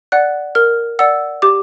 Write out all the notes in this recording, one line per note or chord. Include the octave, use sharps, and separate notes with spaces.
D5 F#5 F#6
A#4 F6
D5 F#5 E6
G4 D6